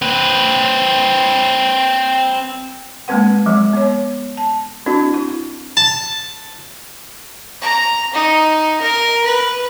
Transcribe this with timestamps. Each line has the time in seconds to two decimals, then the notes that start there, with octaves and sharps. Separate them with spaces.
0.02 C4 B4
3.08 G#3 A#3 C4 B4 F#5
3.46 F3 F#3 G#3
3.73 B3 C#5
4.37 A5
4.86 C4 D4 E4 F#4
5.14 E4
5.77 A5
7.62 A#5
8.14 D#4
8.81 A#4
9.24 B4